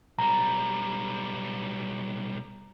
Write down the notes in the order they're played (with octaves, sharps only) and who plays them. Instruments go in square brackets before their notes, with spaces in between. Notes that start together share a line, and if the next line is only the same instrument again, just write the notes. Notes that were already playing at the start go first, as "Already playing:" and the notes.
[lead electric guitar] B1 G3 [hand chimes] A#5